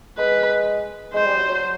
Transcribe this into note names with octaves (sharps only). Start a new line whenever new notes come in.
G#3 B4
G#3 C5
G3
F#3
F#3